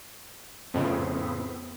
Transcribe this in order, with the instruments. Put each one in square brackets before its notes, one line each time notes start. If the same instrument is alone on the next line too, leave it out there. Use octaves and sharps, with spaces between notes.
[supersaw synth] F2 A2 C#3 [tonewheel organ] B3 C4